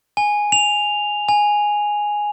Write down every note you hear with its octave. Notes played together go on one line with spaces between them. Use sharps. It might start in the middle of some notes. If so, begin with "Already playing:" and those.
G#5
F7
G#5